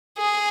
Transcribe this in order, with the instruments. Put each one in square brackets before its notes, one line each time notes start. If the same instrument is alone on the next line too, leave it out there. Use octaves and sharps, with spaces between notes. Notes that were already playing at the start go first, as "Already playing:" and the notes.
[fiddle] G#4